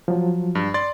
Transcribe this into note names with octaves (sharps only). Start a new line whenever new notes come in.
F3 F#3
G2
D5 C6 A6